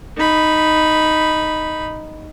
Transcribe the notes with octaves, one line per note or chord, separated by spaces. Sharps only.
D#4 B5